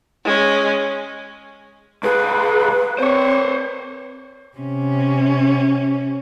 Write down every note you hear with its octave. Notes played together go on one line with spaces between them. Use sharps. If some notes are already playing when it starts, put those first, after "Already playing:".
G#3 C#4
C2 G#4 B4
C4 C5 C#5
C3 C#4